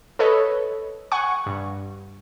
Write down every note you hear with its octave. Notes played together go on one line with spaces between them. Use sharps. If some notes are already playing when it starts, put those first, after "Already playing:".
A4 B4 C#5 D#5
F#5 G#5 C#6
G2